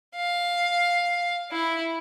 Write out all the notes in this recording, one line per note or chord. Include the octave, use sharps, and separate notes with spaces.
F5
E4